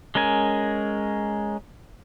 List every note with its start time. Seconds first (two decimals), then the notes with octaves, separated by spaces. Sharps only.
0.15 G#3 C#4 A#4 G#5